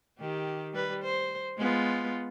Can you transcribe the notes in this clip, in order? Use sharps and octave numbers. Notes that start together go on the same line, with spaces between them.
D#3 G4
G3 B4
C5
G#3 B3 F4